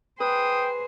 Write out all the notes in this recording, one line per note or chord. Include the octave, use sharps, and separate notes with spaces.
G#4 B4 C5 G5 D#6